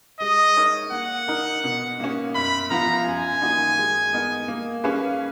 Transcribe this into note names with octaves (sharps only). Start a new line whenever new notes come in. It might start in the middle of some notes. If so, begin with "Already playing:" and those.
G#3 D#5
D#4 A#4 C#5
A#3 F#5
D#4 A#4
B2
A#3 C#4
F#2 B5
F3 B3 F4 A#5
F#2 G#5
D#3 A#3 D#4 F#4
G#3
B3 D#4 A#4 D#5
A#3
C#4 G#4 B4 F5